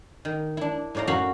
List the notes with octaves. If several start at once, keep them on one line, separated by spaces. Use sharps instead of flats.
D#3
D4 E4
A2 D#4 D5 F5 A#5
F#2 F#4 A#4 F5 A#5 B5